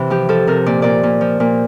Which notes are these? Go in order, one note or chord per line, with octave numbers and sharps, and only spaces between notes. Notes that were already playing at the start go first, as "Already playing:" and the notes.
Already playing: C3 E3
F3 G4
F3 A4
C3 A#4
A#2 D5
A#2 D5
A#2
F3
A#2